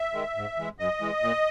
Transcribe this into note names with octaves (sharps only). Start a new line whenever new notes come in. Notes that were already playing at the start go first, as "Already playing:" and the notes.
Already playing: E5
D#3 G#3
G#2
E3 G#3
F#2 D#5
E3 G#3
A#2